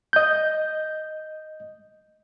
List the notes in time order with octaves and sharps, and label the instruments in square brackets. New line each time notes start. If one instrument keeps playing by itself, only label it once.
[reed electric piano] D#5 G6